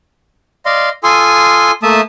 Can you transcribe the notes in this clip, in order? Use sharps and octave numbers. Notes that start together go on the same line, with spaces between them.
D5 D#5 F5 C6
F4 A4 G#5 C6 D#6
A3 A#3 E5 A5 D#6